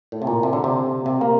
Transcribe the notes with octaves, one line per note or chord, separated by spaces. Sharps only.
A2
C3
A#2
C3
D3
C3
C3
A#3